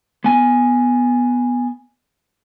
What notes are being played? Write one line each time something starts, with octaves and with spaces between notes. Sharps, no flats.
B3 G#5